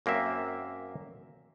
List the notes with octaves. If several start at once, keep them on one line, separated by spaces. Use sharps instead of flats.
F#2 A#3 C4 E5